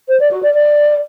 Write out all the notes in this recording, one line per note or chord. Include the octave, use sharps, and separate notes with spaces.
C5
D5
F#4
D5
D5